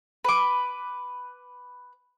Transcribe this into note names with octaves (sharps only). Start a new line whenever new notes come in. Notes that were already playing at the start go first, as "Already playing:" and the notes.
B4 D6